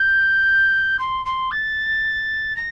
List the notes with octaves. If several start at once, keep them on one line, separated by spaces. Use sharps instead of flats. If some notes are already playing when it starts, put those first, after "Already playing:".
Already playing: G6
C6
C6
A6
A#6